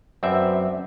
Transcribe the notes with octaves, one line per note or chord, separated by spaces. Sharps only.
F#2 C4 B4 D5 E5